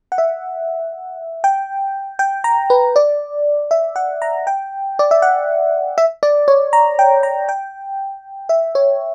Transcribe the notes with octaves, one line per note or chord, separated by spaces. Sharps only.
F#5
E5
G5
G5
A#5
B4
D5
E5
F#5
A#5
G5
D5
E5
F#5
E5
D5
C#5
A#5
G5
A#5
G5
E5
C#5